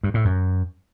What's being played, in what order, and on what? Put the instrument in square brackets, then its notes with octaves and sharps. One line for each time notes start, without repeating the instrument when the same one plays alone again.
[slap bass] G2
A2
F#2